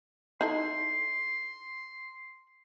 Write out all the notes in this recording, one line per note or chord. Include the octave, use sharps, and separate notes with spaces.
D#4 E4 A4 C6